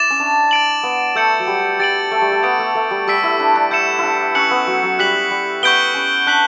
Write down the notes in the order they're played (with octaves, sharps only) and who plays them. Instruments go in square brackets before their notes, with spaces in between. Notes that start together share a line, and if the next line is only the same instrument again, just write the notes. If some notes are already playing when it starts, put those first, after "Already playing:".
Already playing: [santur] E4 [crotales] D6 A6 E7
[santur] C#4
D4
[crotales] A6 D7 F#7
[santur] B3
[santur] A3 [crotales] E6 G6 C#7 F#7
[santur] F#3
G3
[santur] G3 [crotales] A6 D7 F#7
[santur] A3
G3
A3
[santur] B3 [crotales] D6 G6 D7
[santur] A3
A3
G3
[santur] G3 [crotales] C#6 E6 B6 D7
[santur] E4
D4
D4
[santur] E4 [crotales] G6 C#7 E7
[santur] D4 E4
[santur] C#4 [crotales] C#6 F#6 C#7 F#7
[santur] B3
F#3
F#3
[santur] G3 [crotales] F#6 B6 F#7
[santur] G3
[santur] B3 [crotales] C#6 G6 B6 D7 G7
[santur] C#4
[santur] D4 [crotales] F#6 B6 F#7